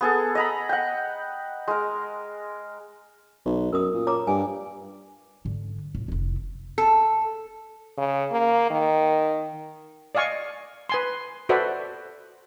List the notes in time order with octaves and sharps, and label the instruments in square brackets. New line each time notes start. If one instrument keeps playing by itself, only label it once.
[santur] B3 G#4 A4
D#5 A#5 B5
F#5 G5
G#3 A#4
[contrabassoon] B1
[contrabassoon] F#2 [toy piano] A#4 D#6
[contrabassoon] A#2
[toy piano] C#5 A#5 D6
[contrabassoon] G2 [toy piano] G#5
[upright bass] G#2 D3
A2
F1 E4
[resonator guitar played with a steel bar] A4
[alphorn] C#3
A#3
D#3
[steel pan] D5 D#5 F5 G#5 C#6
B4 G#5 C6
F#4 A4 B4 C5 D5 E5